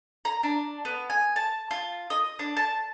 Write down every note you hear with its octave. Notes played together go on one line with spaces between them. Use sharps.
A#5
D4
B3
G#5
A5
F4
D#5
D4
A5